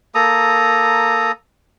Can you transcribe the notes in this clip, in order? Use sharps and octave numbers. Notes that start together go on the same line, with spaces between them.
A#3 A4 A#5 D#6